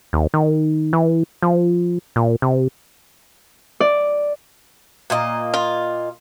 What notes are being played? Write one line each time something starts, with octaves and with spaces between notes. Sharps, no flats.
D#2
D#3
E3
F3
A#2
C3
D5
A#2 A#3 D#5
F4